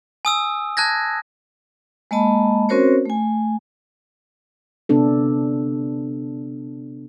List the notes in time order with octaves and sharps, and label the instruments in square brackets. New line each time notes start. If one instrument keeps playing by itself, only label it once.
[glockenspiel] G#5 D#6 E6
A5 F#6 G#6 A#6
[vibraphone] G#3 A#3 D#5 A5 B5
C4 C#4 F#4 A#4 C5 C#5
A3 G#5
[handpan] C3 B3 D4 A4